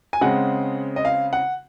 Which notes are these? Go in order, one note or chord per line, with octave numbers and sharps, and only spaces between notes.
G#5
C#3 G#3 C4 F#5
D#5
F5
F#5